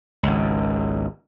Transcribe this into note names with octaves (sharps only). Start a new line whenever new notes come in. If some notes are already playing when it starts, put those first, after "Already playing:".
G#1 C#2